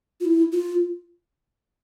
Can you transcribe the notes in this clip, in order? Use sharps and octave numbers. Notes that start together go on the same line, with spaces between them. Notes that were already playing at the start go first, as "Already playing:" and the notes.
F4
E4
F4